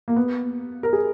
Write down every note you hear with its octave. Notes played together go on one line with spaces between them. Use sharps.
A#3
B3
A#4
G#4